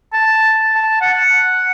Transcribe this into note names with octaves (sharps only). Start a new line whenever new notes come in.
A5
A5
F#5